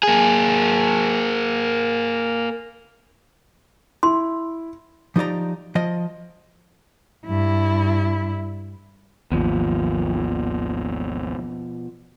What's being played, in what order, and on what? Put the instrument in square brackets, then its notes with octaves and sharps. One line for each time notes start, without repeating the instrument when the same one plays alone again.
[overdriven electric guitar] A#3 G#4
[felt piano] E4 [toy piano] C6
[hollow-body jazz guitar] F3 D#4 G4 D5 A#5
F3 D#5
[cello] G2 E4
[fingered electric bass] G#1 D#2 [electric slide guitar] B2 F3